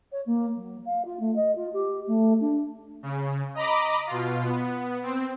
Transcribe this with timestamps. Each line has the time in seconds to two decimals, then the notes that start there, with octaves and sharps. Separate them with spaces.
0.12 C#5
0.26 A#3
0.56 F#3
0.85 F5
1.05 F4
1.19 A3
1.35 D#5
1.55 F4
1.73 G4
2.06 A3
2.40 D4
3.03 C#3
3.55 D#5 A#5 B5 D6
4.07 B2 F4
4.44 B3
5.03 C4